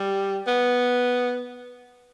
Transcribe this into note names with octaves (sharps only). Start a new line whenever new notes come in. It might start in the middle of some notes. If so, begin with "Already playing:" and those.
Already playing: G3
B3